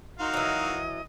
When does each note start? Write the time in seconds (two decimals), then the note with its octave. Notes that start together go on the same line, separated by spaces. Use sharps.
0.19 D#4 F#4 A#4 F5 C6
0.34 E3 F#3 D#5